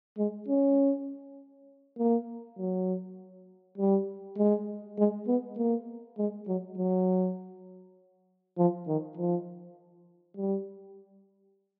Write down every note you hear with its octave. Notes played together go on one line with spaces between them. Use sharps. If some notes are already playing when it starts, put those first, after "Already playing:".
G#3
C#4
A#3
F#3
G3
G#3
G#3
B3
A#3
G#3
F#3
F#3
F3
D#3
F3
G3